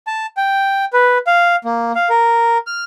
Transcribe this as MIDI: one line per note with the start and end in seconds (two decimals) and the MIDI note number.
0.07 0.26 81
0.37 0.85 79
0.93 1.18 71
1.27 1.56 77
1.64 1.92 58
1.95 2.09 77
2.10 2.58 70
2.67 2.84 89